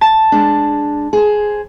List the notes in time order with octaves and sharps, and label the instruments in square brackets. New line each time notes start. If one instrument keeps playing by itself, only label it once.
[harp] A5
[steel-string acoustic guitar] G#3 D4
G#4 C5